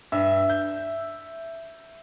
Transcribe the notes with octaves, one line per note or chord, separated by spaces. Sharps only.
G2 E5
G6